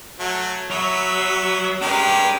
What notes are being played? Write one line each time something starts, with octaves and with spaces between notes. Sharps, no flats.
F#3 A3
F#3 B3 E5
G#3 D4 G4 A#4 B4